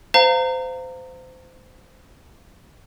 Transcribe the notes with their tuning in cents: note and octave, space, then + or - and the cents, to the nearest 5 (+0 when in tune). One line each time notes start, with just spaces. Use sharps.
C5 -25 F5 +0 A#5 -25